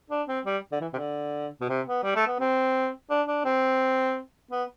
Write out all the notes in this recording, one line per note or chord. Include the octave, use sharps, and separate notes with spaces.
D4
C4
G3
D3
E3
C3
D3
B2
C3
B3
G3
A3
B3
C4
D4
D4
C4
B3